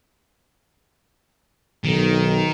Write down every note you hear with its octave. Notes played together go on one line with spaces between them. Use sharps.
B1 D#3